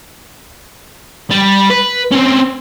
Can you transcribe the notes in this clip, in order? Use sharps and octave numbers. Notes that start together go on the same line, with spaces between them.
G3
B4
C4 C#4